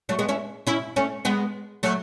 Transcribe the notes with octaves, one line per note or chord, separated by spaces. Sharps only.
F#3 A3
G#3 B3
C#4 E4
C#4 E4
A3 C#4
G#3 B3
F#3 A3